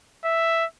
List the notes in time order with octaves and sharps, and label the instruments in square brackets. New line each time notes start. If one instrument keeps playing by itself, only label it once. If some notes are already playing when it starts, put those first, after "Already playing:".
[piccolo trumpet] E5